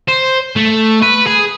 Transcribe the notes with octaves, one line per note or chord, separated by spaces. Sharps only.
C5
A3
B4
G#4